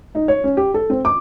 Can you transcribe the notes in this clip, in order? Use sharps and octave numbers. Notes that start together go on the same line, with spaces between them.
D#4
C#5
C#4
G4
A4
C4
D6